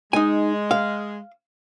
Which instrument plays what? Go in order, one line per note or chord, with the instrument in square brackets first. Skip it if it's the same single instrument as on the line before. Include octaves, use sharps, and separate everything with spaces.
[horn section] G#3 [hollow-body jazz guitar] D#4 G#5
[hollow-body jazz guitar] F5